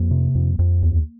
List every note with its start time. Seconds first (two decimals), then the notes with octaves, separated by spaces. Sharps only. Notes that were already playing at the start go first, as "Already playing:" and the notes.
Already playing: F2 A#3
0.11 C3
0.35 F2
0.59 F2
0.82 D#2